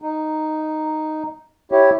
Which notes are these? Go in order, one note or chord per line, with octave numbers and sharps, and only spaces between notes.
D#4
E4 G4 C#5